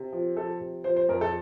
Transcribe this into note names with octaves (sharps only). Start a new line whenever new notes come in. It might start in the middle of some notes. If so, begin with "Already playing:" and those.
Already playing: C3
F3
F3 A4
C3
F3 C5
C5
F2 A#4
A4